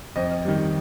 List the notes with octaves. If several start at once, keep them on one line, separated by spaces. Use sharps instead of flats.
F2 D#5
D#3 G3